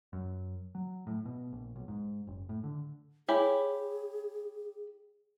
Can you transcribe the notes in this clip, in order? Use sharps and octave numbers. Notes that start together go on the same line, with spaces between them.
F#2
F#3
A2
B2
A#1
B1
G#2
F#1
A2
D3
E4 G4 G#4 C#5 G#5